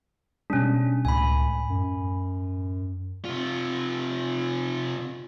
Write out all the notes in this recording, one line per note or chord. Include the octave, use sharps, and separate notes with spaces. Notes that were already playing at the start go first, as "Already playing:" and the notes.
B2 G3 G#3 C#4 D4
C#2 A2 G#5 B5
F#2
C3 F4